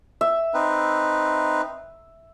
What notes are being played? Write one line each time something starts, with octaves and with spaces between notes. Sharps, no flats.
E5
C4 D#4 B4